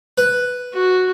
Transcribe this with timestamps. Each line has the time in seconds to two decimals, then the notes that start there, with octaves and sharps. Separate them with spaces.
0.18 B4
0.73 F#4